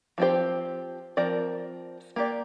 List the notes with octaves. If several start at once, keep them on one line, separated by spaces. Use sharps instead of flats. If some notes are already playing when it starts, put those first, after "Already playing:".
F3 C4 G4 C5
F3 C4 A#4 D5
A#3 G4 D5